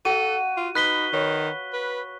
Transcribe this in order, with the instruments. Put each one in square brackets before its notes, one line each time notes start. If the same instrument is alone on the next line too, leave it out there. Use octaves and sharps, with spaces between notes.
[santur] F#4 F5 [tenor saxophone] A4 [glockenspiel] D#7
[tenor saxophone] F4
[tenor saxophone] D#4 [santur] B4 [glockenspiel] F#6 B6 G7
[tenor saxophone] D#3 [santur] C#5
[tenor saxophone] B4